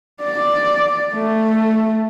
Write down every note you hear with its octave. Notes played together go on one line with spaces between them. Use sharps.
D5
A3